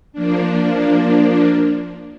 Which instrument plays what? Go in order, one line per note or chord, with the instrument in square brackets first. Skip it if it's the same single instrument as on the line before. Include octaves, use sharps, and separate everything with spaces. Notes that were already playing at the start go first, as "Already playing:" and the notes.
[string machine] F3 A#3 D4